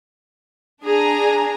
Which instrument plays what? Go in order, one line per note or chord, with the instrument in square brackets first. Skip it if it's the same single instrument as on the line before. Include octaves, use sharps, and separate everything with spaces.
[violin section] D4 G#5 A#5 [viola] G#4